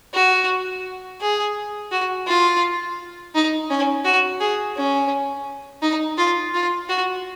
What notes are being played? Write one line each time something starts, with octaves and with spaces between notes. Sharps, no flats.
F#4
G#4
F#4
F4
D#4
C#4
F#4
G#4
C#4
D#4
F4
F4
F#4